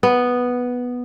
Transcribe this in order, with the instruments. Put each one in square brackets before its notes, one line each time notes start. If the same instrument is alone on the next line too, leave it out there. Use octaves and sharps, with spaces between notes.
[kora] B3